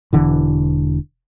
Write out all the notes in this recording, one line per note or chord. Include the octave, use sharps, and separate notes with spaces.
E1 D3 E3